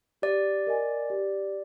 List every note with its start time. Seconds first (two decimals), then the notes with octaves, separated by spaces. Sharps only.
0.22 G4 D5
0.67 A#4 D#5 G#5
1.10 G4